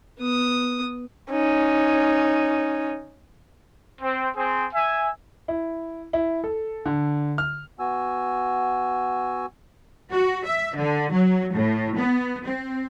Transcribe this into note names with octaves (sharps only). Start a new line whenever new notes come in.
B3 D#6
C#4 D#4
C4
C4 G#4
E5 G#5
E4
E4
A4
D3
F6
B3 F#4 G#5 E6
F#4
E5
D3
F#3
A2
B3
C4